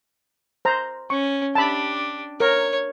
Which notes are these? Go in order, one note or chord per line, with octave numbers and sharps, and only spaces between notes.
C5 A#5
C#4 C#6
D4 G4 A5 B5
A#4 C#5